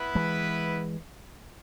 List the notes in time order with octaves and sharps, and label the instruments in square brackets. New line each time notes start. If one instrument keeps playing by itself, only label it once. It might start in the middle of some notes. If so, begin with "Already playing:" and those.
Already playing: [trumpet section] B3 E4 B4
[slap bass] E3 G#3